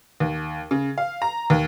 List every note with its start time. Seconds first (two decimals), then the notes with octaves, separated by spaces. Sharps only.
0.20 D#2
0.71 C#3
0.98 F5
1.22 A#5
1.50 D#2